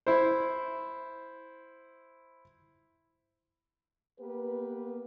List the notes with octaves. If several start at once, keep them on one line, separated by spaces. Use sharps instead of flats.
E4 C5
A#3 B3 G4 B4